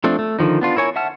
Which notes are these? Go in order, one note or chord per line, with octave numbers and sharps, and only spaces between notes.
F3 A3 C4 D4
A3
D3 D#3 F3 D#4
B3 D4 F4
E4 A#4 C#5 G#5
E5 F#5 A5 F6